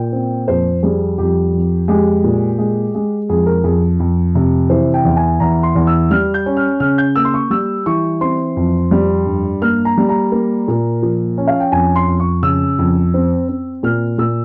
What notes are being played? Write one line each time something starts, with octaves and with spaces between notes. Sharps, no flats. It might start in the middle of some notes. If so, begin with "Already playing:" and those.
Already playing: A#2 G5
C4
F2 C5
G3 G#4
F2 G4
F2
G#3 G4
A#2
G#3
G#3
F2 G#4
A#4
F2 G#4
F2
C3
E3 C5
G5
E2
G#5
E2 A#5
C6
E2
E6
G3 F6
G6
C#4
F6
C#3 F6
G6
A#3 E6
C6
C#6
G3 E6
E3 C#6
C4 C6
F2
G3
G2
A#3 F6
A#5
G3
A#5
A#3
A#2
F3
C#4
F5
G5
F2 G#5
C6
F2
C#6
C#3 E6
F2
C4
C4
A#2 F6
A#2 E6